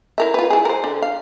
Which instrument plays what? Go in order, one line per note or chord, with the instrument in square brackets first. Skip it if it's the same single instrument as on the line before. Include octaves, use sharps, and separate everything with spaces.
[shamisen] E4 A#4 E5
F4 B4
E4 G#4
A#4 C5
D3
F5